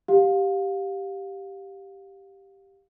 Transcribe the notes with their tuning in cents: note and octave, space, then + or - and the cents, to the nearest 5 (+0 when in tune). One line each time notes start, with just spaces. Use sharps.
G4 +0 F5 +25